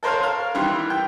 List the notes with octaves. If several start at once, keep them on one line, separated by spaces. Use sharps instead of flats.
A4 A#4 C5 C#5 F5
F5
D#3 E3 G3 C6
G5